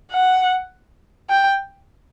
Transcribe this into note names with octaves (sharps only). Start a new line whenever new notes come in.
F#5
G5